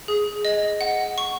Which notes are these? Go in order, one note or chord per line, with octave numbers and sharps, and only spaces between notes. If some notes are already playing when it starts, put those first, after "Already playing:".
G#4
D#5
F#5
C#6